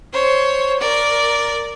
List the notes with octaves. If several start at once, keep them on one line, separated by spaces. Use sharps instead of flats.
C5 C#5
A#4 D5